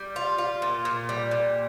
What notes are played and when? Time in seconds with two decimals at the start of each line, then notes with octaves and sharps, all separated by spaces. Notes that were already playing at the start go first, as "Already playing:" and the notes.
Already playing: G3
0.16 F4
0.38 F4
0.62 A#2
0.85 A#2
1.09 G3
1.31 A#2